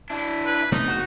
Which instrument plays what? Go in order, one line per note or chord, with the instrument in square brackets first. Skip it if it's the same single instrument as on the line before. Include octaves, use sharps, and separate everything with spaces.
[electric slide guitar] D4 E4
[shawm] B4
[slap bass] C3 A3 B3 [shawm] D#4
[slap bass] E1 [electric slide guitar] F#4